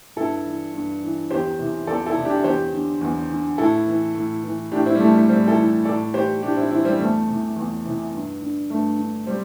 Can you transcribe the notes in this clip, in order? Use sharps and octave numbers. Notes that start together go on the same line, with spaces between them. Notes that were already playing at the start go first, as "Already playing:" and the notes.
G2 E4 A4
E3
G2
E3
E2 G4 C5
C3 E3
E2 A4 D5
E4 A4
C3 E3
D4 G4
E2 G4 C5
D3
E2
D3
A2 E4 A4
E3
A2
E3
A2 D4 G4
C4 E4
G3
E3 A3
A3
A2 G3 C4
E4 A4
E3
A2 A4 D5
E3 G4 C5
A2 D4 G4
C4 E4
E3 C4 E4
G3 C4
E2 A3
C3 E3
E2
C3 E3
G2
D3
G2 A3
D3
G3 C4